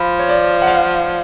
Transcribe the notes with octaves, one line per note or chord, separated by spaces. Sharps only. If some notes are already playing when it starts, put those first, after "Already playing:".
Already playing: F3 B5
C#5
D5
F#5
F5